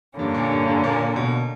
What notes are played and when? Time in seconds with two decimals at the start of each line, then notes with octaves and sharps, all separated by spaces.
0.19 G2 D3 A#3 C#4
0.34 A#2
0.51 G2
0.67 G2
0.84 A#2
1.16 B2